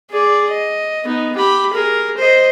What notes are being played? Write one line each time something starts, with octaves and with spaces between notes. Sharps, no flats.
G#4 D5
D#5
B3 D#4
G4 B5
G#4 A#4
C5 D#5